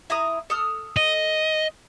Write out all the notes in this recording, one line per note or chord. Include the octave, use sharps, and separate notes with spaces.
E4 A#5 D#6
A4 D#6 F6
D#5